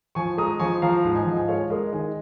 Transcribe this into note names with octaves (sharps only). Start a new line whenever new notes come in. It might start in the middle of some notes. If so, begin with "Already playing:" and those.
F3 G#5 C#6
G#3 A#5 D#6
F3 G#5 C#6
F3 F5 A#5
G#2
D#5 G#5
F3
G#5
G#3 C#5 F5
G#3 A#4 D#5
D#3 D#5 G#5